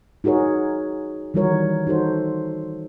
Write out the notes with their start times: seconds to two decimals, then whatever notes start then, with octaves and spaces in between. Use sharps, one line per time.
0.24 D#4 F#4 G#4 A#4 C#5
1.34 D#3 E3 G3 F#4 A#4 C#5
1.87 D#4 F#4 A4 C5 C#5